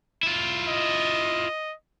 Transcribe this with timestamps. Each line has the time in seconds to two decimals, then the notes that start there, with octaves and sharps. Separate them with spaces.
0.23 E4 F4
0.67 D#5